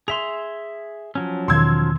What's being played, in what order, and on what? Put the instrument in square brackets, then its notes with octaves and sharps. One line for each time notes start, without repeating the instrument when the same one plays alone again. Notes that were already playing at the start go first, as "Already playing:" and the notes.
[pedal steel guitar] G#4 E5 C6 [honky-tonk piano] F7
[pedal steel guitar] F3 F#3 C#4
[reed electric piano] E2 B2 D#3 [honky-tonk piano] C6 E6 G#6